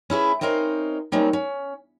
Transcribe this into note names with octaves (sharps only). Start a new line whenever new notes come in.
C#4 E4 G#4 B4
C4 C#4 D#4 A#4 C5
G3 A#3 C4 C#4 D#4
C#4